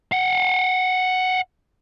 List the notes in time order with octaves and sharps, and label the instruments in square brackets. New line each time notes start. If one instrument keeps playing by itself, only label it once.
[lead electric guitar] F5 F#5